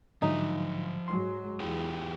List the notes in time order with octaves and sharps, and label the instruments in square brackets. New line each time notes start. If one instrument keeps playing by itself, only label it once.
[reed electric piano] G#2 D3 F#3 [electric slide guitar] F3 E5 [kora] D#4
[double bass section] G#2 F#3 G#3 [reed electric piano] C6
[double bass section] E2 [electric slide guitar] E4 G4 G#4